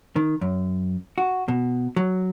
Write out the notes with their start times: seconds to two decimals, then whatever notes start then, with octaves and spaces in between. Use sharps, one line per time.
0.16 D#3
0.41 F#2
1.18 F#4
1.48 B2
1.96 F#3